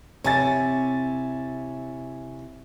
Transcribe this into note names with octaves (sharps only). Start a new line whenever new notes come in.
C3 E4 C#5 G#5 A6